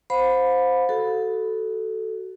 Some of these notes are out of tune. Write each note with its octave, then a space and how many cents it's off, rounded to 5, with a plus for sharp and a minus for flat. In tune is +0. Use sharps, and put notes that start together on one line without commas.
C5 -5 F5 +45 B5 +0
F#4 +25 A4 +0